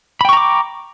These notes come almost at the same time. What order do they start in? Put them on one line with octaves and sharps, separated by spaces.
B5 G5 C#6 A#5 D6